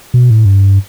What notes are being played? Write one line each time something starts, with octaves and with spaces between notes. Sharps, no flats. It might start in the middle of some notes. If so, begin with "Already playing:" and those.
B2
A2
G2